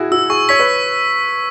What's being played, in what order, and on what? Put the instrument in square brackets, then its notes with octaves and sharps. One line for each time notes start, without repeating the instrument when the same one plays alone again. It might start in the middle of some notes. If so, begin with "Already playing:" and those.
Already playing: [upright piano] E4 F#4 G#4
[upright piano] F#4 [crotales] E6
[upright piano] G#4 [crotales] C#6
[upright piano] C#5 [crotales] B6
[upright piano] B4